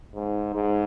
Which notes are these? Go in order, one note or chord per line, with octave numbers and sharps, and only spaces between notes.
G#2
G#2